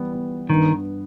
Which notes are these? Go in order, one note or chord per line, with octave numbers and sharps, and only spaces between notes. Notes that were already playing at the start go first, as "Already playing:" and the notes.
Already playing: E3 G3 B3
B3
G2 D#3